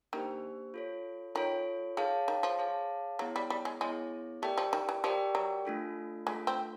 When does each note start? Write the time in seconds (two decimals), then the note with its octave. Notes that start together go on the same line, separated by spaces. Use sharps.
0.13 D#3 A#3 D4 G4 C5
0.74 F4 A4 C#5
1.35 D#3 F4 A4 C#5
1.97 D#3 G#4 C#5 F5 A5
2.28 D#3
2.43 F3
2.59 G#4 C#5 F5 A5
3.19 F#3 B3 E4 G#4 C#5
3.36 G3
3.50 G3
3.65 G#3
3.81 G#3 B3 E4 G#4 C#5
4.42 A3 G4 A#4 D5 G5
4.58 F3
4.73 D#3
4.89 E3
5.04 F3 G4 A#4 D5 G5
5.35 F#3
5.65 A3 D4 F4 A4
6.27 G#3 A3 D4 F4 A4
6.47 C4